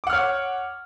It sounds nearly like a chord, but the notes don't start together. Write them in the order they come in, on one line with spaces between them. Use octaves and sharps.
D6 F#5 F6 C#5